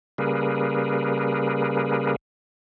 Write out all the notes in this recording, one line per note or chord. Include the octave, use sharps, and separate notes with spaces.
C#3 G3 A#3 G#4 A#4 B4